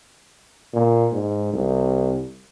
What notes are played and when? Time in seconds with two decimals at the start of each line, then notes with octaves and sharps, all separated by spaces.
0.74 A#2
1.12 G#2
1.53 C2